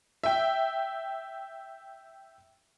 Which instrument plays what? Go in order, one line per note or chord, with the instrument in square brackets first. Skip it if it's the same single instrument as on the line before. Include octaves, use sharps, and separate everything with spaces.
[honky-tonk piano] E5 G5